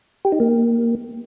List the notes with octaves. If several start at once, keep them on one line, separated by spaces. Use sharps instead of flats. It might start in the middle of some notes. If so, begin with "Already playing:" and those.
G4
D#4
A#3